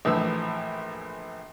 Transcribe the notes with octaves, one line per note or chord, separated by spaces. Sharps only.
A#1 A2 E3 F3 E6